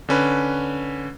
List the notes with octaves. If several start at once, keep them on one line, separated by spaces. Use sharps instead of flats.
D3 C#4 B4